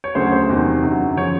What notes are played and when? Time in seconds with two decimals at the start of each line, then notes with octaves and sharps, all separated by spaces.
0.04 C#5
0.15 D2 C#3 F#3 C5
0.32 C5
0.49 E2 C3 D#3 F#3
0.83 F#2 D3 F#3
1.17 C#3 F3 C#5